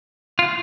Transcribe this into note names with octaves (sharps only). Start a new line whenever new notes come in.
F4